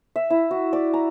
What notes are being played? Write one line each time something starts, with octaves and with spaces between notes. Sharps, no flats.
E5
E4
F#4
D5
A#5